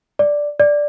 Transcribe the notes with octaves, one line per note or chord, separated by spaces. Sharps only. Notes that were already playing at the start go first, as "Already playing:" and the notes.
D5
D5